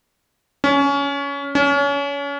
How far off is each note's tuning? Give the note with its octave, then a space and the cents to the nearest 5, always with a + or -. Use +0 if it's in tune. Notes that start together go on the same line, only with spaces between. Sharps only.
C#4 +20
C#4 +30